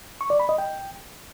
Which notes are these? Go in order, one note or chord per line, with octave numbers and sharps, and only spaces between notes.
C#6
D5
B5
D#5
G5